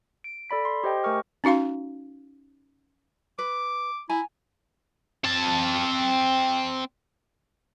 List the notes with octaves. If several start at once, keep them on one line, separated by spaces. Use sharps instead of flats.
D7
A4 D5 B5 B6
C6
G4 C5 D#5 G5
A3 A#4 G#5 C#6 F6
C#4 D#4 F#4 F5 C6
B4 D6
E4 G#5 A#5
C4 A5